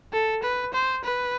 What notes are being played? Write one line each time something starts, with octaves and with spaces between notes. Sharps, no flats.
A4
B4
C5
B4